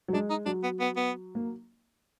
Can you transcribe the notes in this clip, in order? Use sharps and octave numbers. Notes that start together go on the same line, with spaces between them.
F#3
G#3 D4
D#4
F#3 D4
B3
B3
B3
A#3